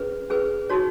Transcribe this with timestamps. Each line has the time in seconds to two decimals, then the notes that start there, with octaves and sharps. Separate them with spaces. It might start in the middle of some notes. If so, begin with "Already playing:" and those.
Already playing: C#4 G#4 B4
0.30 C#4 G#4 B4
0.70 D#4 F#4 C#5